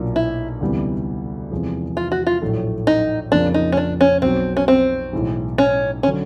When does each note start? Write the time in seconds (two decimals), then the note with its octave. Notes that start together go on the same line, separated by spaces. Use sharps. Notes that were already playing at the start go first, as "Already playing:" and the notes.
Already playing: B1 A#2 F#3 A#3 D4
0.16 E4
0.61 D2 C3 E3 G3 B3
1.51 E2 C3 F3 G#3
1.97 F4
2.12 F#4
2.27 F4
2.42 A#1 A2 F#3 A3
2.87 D#4
3.32 F2 C#3 F3 A#3 C#4 D4
3.54 D#4
3.72 C#4
3.77 D4
4.01 C#4
4.22 B1 B2 F#3 C4
4.57 C#4
4.68 C4
5.13 B1 A2 E3 G#3
5.58 C#4
6.03 C#4
6.06 D3 F#3